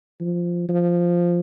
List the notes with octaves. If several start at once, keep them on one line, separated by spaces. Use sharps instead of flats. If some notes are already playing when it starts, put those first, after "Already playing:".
F3
F3